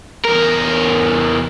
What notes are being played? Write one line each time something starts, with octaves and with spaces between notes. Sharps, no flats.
E2 A#4